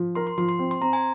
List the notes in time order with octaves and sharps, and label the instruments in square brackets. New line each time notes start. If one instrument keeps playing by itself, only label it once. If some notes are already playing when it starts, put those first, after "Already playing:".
Already playing: [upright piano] F3
[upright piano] A#4 [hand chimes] C6
[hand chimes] C6
[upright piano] F3 [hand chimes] C6
[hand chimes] C6
[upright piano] C4
[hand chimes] C6
[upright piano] C4 [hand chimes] A#5
[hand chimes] G#5